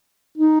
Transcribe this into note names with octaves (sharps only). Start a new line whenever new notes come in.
D#4